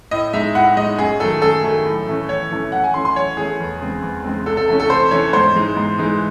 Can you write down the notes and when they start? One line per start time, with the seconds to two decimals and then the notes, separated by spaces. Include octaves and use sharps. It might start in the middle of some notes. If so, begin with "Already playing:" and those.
0.11 A2 D#5
0.33 G#3 D#4 E5
0.55 A2 F#5
0.77 G#3 D#4 D#5
0.98 F#2 G#4
1.20 D#3 F#3 A3 A4
1.42 F#2 A4
1.64 D#3 F#3 A3
1.86 A2
2.07 E3 A3 C#4
2.29 A2 C#5
2.50 E3 A3 C#4
2.72 F#2 F#5
2.84 G#5
2.94 E3 A3 C#4 C6
3.05 C6
3.16 F#2 C#5
3.37 E3 A3 C#4 G#4
3.60 E2
3.81 C#3 G#3 C4
4.03 E2
4.24 C#3 G#3 C4
4.46 C3 A4
4.57 A4
4.68 E3 A3 C#4 A4
4.80 A4
4.90 C3 C5
5.11 E3 A3 C#4 C#5
5.33 G#2 C5
5.55 E3 G#3 D#4
5.77 G#2
5.98 E3 G#3 D#4